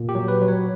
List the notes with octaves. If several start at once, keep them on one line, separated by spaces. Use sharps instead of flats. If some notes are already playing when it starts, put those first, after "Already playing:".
Already playing: A#2
G4
F#3
B4
F#3
C#5